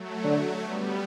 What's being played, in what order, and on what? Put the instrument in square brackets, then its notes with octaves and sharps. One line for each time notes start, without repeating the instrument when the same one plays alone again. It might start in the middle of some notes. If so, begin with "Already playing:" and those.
Already playing: [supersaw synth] F#3 A3
[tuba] D3
[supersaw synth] G3 B3